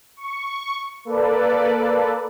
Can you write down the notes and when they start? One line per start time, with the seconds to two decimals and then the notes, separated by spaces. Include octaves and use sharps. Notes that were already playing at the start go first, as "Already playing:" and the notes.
0.16 C#6
1.05 A#3 A4 B4 D5